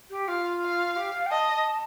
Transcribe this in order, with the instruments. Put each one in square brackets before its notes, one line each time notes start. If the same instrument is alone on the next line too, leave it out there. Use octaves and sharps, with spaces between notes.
[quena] G4
[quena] F4 [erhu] F5
[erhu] F5
[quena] G4
F5
G5
[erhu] D#5 [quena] A5